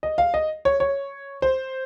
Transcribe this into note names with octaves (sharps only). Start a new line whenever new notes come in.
D#5
F5
D#5
C#5
C#5
C5